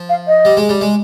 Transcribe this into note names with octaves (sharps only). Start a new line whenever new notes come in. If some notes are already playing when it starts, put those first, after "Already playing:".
Already playing: F3
F5
D#5
G3
G#3
G3
G#3